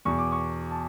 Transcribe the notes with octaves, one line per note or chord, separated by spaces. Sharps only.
E2 B2 C#6
D6
C#6
A5